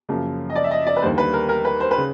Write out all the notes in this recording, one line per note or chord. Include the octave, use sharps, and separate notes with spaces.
F#2 C#3 F3 A#3
D#5
D5
E5
D#5
D5
B4
D#2 D3 G3 A#3 C5
B4
A#4
A#4
B4
C5
B4
C#3